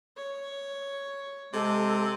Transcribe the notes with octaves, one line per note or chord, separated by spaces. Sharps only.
C#5
C3 G#3 A4